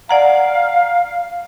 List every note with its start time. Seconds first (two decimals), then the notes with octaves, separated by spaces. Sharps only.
0.09 D5 F5 F#5 A#5